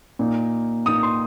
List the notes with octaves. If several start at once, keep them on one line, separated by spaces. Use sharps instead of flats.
A#2 A#3 D#4
A#2 A#3 D#4 D#6
C6